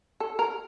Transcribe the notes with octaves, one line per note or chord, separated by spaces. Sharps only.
A4
A#4